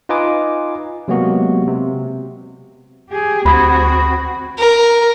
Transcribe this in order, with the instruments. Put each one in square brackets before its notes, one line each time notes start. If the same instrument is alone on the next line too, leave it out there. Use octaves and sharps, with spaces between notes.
[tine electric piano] D#4 F4 B4 D#5 G#5 D6
C3 F#3 G#3 A#3 B3 F#4
C3
[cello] G4 G#4
[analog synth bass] D2 [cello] C4 F#4 [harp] B5 D#6 G#6
[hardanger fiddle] A#4